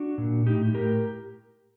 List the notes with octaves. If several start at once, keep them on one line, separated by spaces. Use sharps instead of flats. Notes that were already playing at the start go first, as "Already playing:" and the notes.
Already playing: D4 F#4
A#2
A2 D#4 G4
A2 G4 A#4